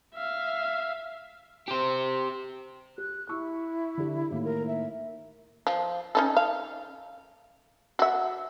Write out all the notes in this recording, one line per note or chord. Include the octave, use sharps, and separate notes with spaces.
E5 F5
G4 C5
G4 F#6
E4 C#6 E6
D3 G4
A2 D#3 A#3
A#4
E5
F3
C#4 D#4 A4
F5
F#4 E5